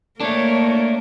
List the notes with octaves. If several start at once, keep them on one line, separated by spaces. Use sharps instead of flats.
A3 A#3 D4 A#4 C#5